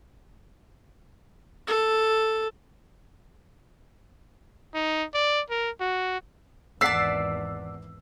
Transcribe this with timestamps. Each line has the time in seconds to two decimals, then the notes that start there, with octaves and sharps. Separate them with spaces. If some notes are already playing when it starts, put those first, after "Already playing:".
1.67 A4
4.74 D#4
5.14 D5
5.50 A#4
5.80 F#4
6.81 G#1 E2 D5 F#5 A5 E6 B6 C7